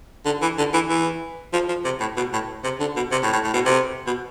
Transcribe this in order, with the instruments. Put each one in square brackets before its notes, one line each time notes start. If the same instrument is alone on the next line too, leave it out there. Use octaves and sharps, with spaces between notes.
[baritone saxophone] D3
E3
D3
E3
E3
F3
F3
C3
A2
B2
A2
C3
D3
B2
C3
A2
A2
A2
B2
C3
B2